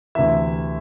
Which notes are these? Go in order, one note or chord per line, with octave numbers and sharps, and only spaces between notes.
D2 C3 E3 E5